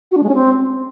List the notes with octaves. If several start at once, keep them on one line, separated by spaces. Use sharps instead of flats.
F#4
D4
G#3
C#4
C4